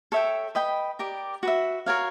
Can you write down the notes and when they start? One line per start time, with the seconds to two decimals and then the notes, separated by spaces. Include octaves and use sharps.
0.12 A4 C#5 E5 G5
0.55 B4 D#5 G5 B5
0.99 G4 A#4 D5
1.43 F#4 B4 E5
1.86 F#4 A#4 C#5 F5